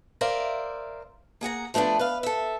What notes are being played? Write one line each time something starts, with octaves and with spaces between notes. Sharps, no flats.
A#4 C5 D5 E5 F5
A#3 G#4 F#5 A#5
F3 A3 B3 C#4 D4
B4 F5
A4 E5